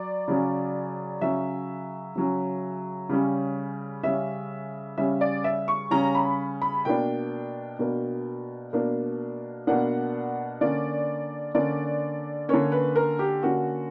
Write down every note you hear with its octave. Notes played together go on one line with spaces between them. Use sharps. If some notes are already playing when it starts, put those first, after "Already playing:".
Already playing: F#3 D5
C#3 F#3 C#4
C#3 F#3 C#4 E5
C#3 F#3 C#4
C#3 G3 C#4
C#3 G3 C#4 E5
C#3 G3 C#4 E5
D5
E5
C#6
C#3 G3 C#4 A#5
B5
B5
B2 A#3 D4 G5
B2 A#3 D4
B2 A#3 D4
B2 A#3 D4 F#5
D3 A#3 C#4 D5
D3 A#3 C#4 D5
D3 A#3 C#4 C#5
B4
A#4
G4
D3 A#3 C#4 F#4